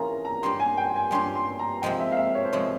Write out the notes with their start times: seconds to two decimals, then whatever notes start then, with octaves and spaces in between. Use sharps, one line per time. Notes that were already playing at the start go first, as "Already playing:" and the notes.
Already playing: E3 A#3 C#4 F4 G#4 A#5
0.25 A#5
0.43 G2 G3 C#4 G4 C6
0.60 G#5
0.77 G5
0.96 G#5
1.11 G2 G3 C#4 G4 C6
1.35 C6
1.59 A#5
1.82 C3 F3 G#3 G5
1.99 E5
2.12 F5
2.17 E5
2.35 C#5
2.45 C5
2.52 C3 F3 G#3 C#5